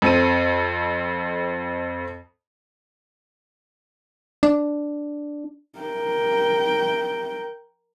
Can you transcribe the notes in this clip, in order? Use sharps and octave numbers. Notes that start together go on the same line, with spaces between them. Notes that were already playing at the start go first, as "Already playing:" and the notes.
F2 C4 A4 D#7
D4
A#4 G5